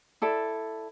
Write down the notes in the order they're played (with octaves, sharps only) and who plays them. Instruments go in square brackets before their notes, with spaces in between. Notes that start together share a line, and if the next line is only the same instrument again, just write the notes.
[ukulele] E4 A4 D5